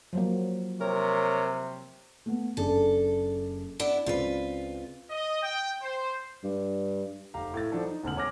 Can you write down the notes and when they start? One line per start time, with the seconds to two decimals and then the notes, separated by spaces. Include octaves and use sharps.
0.13 F3 F#3 A#3
0.81 C3 A#4 C#5
2.26 A3 B3
2.57 F#1 D4 G#4 A4
3.79 B3 D4 E4
4.06 C#2 C4 F4 B4 C7
5.10 D#5
5.43 G5
5.82 C5
6.44 G2
7.34 F1 G4 F5 A#5
7.54 A2 A4 A6
7.72 F3 F#3 D4 A4
7.84 D#4
8.04 E1 D2 C#3 A5 F6 F#7
8.16 C#5 G#5 D6 F6 A#6